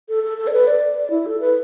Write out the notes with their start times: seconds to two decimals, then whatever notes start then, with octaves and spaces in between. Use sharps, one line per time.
0.09 A4
0.24 A4
0.38 A4
0.47 D5
0.52 B4
0.67 D5
0.97 D5
1.10 E4
1.26 A4
1.40 B4